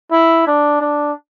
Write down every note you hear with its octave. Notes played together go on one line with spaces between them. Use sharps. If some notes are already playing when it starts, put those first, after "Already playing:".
E4
D4
D4